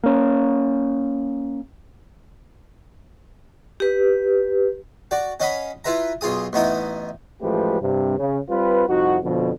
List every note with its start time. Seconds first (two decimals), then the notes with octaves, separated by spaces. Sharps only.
0.04 A#3 C#4
3.80 G4 B4
5.11 F#4 D5
5.40 C#4 D#5 F5 F#5 B5 D#6
5.84 E4 F4 B4 E5 A#5
6.21 B1 F4 G#4 D#6
6.53 A1 B3 D#4 E4 D#6
7.42 A1 F3 G#3 A3 G4 B4
7.81 G2 C3
8.18 C#3
8.50 G3 C4 F4 B4
8.88 C2 F2 D#4 F#4
9.23 F2 B2 D3